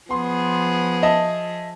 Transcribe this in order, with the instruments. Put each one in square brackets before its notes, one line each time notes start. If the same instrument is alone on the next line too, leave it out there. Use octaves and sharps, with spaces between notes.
[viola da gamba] F3 G#4 [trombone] B3 [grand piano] C6
[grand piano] D#5 E5 A5